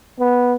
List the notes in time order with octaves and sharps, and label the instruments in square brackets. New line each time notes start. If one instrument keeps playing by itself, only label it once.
[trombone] B3